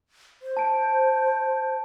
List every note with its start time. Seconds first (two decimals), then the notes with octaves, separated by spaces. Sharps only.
0.42 C5
0.57 A5 D7